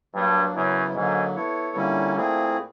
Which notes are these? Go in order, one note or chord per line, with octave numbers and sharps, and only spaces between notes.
G2 F#3 A#3 D4
F#2 C#3 F#3 B3 E4
G#2 D3 F#3 A#3
B3 E4 A4 C#5
A#2 D3 G3 A#3 C#4 E4
A3 C4 E4 G#4